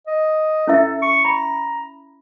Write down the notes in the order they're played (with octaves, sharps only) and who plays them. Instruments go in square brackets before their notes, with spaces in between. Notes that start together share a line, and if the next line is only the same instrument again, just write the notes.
[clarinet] D#5
[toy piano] C#4 E4 E5 [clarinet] A4
[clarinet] C#6
[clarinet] A#5 [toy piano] B5